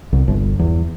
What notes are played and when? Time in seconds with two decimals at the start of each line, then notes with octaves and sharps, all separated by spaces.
0.13 C2
0.28 G1
0.59 E2